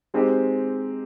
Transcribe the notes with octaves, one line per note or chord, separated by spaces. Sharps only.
G#3 C4 D#4 G4